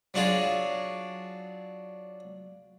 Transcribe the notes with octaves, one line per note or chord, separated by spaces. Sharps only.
F#3 D4 F4 G#4